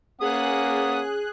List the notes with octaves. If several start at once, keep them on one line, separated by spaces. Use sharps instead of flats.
A#3 C#4 G#4 F#5 D#6 F#6